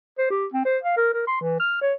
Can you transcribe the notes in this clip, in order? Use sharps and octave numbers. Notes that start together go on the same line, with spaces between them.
C5
G4
C4
C5
F5
A#4
A#4
C6
E3
F6
C#5